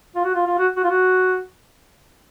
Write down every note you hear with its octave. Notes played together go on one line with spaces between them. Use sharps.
F4
F#4
F4
F4
F#4
F#4
F4
F#4